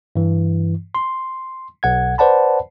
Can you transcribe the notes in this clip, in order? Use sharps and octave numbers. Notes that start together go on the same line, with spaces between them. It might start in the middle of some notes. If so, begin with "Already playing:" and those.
G2 E3
C6
B1 F#5 G#6
B4 C5 D5 F#5 A5 B5